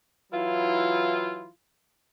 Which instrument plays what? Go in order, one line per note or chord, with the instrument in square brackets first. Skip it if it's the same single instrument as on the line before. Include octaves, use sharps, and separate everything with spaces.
[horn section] E3 F#3 E4 F4